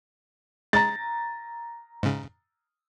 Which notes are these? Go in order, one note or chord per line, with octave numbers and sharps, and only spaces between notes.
G#3 A#5 A6
G#2 C#3